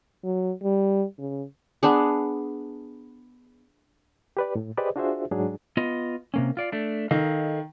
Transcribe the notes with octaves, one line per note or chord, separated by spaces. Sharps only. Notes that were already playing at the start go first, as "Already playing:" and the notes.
F#3
G3
C#3
B3 D4 G#4
G4 B4 D5
A2
G4 G#4 B4 C5 D5 D#5
D4 F4 F#4 G#4 C5 E5
G#2 F#3 G#3 D4 G#4
B3 F4 D#5
C3 A#3 C#4
F4 D5 F5
A3 D4
D#3 A4 D#5 F5